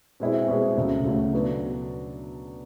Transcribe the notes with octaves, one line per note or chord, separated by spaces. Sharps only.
B2 G#3 C4 E4 G#4
B2 G#3 C4 E4 G#4
D2 C#3 F#3 A3
D2 C#3 F#3 A3
B2 F#3 B3 D4